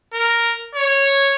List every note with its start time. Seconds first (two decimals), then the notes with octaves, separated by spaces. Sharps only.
0.14 A#4
0.75 C#5